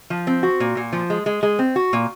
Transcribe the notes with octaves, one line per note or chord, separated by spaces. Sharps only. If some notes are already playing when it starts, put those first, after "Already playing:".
F3
C4
F#4
A#2
A#2
F3
G#3
G#3
G#3
C4
F#4
A#2